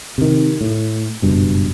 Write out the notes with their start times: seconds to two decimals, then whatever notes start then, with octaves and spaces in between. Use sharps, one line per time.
0.18 C3 D#3
0.61 A2
1.22 F#1 G2 B2